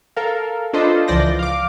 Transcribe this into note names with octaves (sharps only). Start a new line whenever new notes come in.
A4 A#4 F5
D4 F4 A4 B4 C5 D#5
C#2 E3 F3 D5 G6 A#6
F5 D6